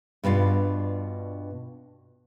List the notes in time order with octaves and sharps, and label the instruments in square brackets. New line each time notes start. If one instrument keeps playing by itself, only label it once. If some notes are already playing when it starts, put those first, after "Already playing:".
[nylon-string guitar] G2 B2 D4 F4